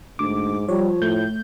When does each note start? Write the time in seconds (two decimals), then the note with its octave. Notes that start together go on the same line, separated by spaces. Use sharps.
0.19 D2 G#2 D6
0.68 F3 G3 C#5
1.02 A2 A3 G6